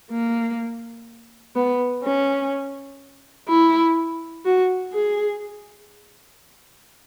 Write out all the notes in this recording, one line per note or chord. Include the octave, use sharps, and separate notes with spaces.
A#3
B3
C#4
E4
F#4
G#4